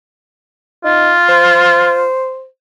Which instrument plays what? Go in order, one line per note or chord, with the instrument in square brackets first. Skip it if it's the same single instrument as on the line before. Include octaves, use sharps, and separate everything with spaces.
[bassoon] D#4 [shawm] F4
[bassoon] C5